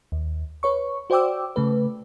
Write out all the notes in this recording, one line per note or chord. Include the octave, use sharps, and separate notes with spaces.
D#2
B4 C#5 C#6
F#4 C5 D5 G5 D6 E6
C#3 A3 B4